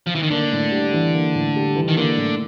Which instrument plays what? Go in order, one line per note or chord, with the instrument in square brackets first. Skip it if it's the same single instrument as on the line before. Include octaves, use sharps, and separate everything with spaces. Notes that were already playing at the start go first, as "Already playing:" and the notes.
[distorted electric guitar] F3
E3
D#3
[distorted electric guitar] D3 [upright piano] A#3
[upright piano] A2
G3
E3
A#3
A2
G3
E3
[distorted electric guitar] D#3
[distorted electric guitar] D3 [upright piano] A#3
[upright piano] A2